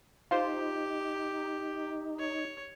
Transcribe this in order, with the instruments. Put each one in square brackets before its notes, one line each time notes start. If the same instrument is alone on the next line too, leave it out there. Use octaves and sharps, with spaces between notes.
[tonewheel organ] D#4 [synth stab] F4 C5 [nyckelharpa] G4
[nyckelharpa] C#5